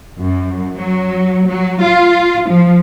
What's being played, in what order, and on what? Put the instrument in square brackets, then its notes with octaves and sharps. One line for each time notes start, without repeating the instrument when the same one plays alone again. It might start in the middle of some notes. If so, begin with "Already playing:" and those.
[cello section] F#2
F#3
F#3
F4
F3